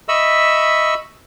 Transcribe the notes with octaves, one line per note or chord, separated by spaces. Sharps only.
D#5 E5 B5 C#6 E6